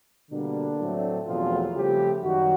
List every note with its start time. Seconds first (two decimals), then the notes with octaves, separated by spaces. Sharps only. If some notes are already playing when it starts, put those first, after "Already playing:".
0.31 B2 D3 G3 A#3 D4
0.79 A2 F#3 A3 C4
1.27 E2 B2 F3 F#3 A3 C4 F4
1.75 C#3 F3 G3 A3 C4 G4
2.23 F#2 D#3 F#3 G3 F#4